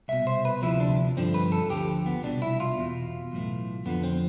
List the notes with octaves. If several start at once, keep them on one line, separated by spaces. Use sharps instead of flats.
C2 B2 E5
C5
B4
D2 C3 F3 E4
D4
G2 D3 F3 C4
B4
A4
D2 D3 F3 G4
B3
C2 B2 D4
E4
F4
E2 B2
B1 A2 E3
F2 D3 F3 B3
C4